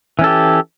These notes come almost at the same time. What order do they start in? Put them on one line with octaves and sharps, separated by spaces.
E3 C#4 A4 G4